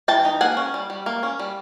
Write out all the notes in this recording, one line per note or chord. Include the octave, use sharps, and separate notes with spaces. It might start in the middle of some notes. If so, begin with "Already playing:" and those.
E3 G5 A5
D#4
A#3 F#5 G#5
C#4
G3
G3
A#3
C#4
G3